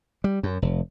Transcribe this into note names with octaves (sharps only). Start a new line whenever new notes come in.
G3
F#2
F1